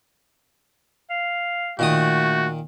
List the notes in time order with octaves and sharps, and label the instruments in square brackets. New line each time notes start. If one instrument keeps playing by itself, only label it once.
[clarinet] F5
[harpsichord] A#2 D#3 D#6 [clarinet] A3 [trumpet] F#4